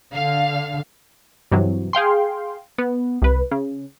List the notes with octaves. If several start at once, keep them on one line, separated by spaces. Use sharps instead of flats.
D3 F5
G2 C3 E3 F#3
G#4 F5 G5 C6
B3
C2 B4
C#3